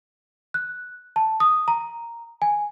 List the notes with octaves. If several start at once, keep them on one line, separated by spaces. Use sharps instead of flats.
F#6
A5
D#6
A#5
G#5